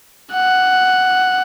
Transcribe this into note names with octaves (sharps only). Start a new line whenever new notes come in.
F#5